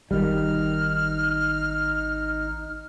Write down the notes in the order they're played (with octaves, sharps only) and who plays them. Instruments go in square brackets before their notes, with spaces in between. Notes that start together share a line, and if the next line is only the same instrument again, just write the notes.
[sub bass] G#1 [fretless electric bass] D#3 G3 [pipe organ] D#4 [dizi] F6